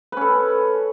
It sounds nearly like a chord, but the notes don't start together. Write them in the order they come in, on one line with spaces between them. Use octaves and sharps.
B4 C#4 A4